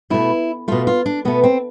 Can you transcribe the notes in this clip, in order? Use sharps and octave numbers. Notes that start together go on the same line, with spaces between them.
B2 A3 E4
B2 A3 F4
F4
D4
B2 A3 B3
C4